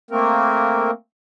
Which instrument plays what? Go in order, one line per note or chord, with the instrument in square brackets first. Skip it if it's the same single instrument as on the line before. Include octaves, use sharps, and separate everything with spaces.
[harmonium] A3 A#3 C4 A#4